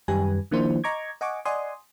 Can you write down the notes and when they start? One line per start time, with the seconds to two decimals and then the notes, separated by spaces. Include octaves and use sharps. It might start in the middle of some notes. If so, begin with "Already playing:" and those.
0.08 F#2 D#3 G3 G4 B4 G#5
0.51 D#3 F3 A#3 D4 E4 C5
0.84 D#5 A#5 C#6 D6 G#6
1.21 D#5 F#5 G#5 C#6 D6
1.45 D5 D#5 F#5 G#5 C6 D#6